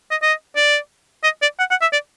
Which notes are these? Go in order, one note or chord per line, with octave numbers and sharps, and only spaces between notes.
D#5
D#5
D5
D#5
D5
F#5
F#5
E5
D5